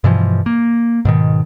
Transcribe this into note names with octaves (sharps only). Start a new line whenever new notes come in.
G2 B2 E3 F3
A#3
G#2 B2 D#3